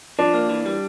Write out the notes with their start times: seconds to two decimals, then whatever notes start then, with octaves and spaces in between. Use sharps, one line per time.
0.19 F3 D4
0.34 A#3
0.49 E3
0.66 G3